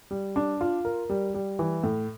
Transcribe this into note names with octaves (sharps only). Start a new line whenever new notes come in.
G3
D4
F4
A#4
G3
G3
E3
A2